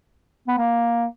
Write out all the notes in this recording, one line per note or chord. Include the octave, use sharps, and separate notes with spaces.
B3
A#3